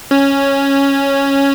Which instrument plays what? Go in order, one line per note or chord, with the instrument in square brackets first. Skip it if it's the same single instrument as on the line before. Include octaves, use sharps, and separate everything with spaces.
[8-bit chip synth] C#4